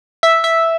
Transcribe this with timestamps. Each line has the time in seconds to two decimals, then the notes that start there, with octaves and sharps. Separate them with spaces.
0.23 E5
0.44 E5